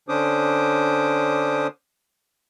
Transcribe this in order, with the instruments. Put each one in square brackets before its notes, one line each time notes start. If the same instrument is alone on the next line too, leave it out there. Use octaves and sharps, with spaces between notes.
[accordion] D3 C#4 D4 C5 D6 D#6